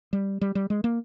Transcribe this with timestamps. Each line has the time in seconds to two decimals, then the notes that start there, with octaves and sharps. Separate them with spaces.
0.13 G3
0.41 G3
0.55 G3
0.70 G#3
0.84 A#3